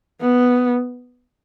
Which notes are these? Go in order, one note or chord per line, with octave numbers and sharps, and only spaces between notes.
B3